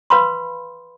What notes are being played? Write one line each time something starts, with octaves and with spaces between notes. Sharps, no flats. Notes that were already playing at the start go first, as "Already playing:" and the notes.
B4 F5 B5 C6